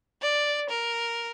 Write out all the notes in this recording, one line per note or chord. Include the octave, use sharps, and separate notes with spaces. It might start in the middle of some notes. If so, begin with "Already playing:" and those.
D5
A#4